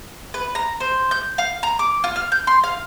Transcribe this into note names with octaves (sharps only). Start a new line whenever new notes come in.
B4
A#5
C5
G6
F5
A#5
D6
F4
F6
G6
C6
F5